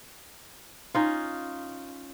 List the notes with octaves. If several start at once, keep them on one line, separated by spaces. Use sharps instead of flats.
C#4 D#4 F4